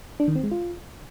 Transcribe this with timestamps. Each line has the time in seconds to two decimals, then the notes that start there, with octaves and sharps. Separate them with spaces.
0.20 D4
0.28 D#3
0.36 C4
0.44 G#3
0.51 F4